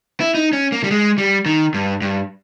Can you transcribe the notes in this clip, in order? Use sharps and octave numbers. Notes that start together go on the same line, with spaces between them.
E4
D#4
C#4
A#3
G3
G#3
G3
D#3
G2
G2